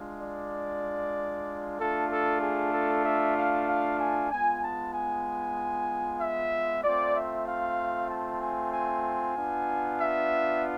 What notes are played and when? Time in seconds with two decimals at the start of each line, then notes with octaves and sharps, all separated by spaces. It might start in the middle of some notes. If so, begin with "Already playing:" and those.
Already playing: G#3 D4 F4
0.22 D5
1.79 A3 D4 F4 A4
2.11 A4
2.42 G#4
2.74 A4
3.05 E5
3.37 F5
3.69 F5
4.00 G#5
4.31 G#3 B3 F4 G#5
4.63 A5
4.95 G#5
6.21 E5
6.84 A3 C4 F4 D5
7.16 E5
7.47 F5
8.10 A5
8.41 G#5
8.73 G#5
9.36 B3 D4 F4
9.99 E5